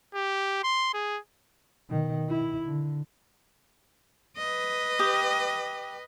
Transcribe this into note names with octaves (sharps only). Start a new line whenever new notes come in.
G4
C6
G#4
B2 D#3
E4
D3
B4 D#5
G4 D#6